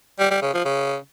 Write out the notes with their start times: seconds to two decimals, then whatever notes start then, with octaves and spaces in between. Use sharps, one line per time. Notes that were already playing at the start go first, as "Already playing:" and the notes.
0.19 G3
0.31 G3
0.42 C#3
0.53 F3
0.65 C#3